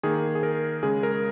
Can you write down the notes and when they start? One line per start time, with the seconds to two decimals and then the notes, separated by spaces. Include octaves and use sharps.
0.03 D#3 A#3 G#4
0.35 G#4
0.43 A#4
0.83 C#3 G#3 G#4
1.03 A#4